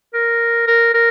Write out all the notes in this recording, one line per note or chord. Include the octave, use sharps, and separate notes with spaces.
A#4
A#4
A#4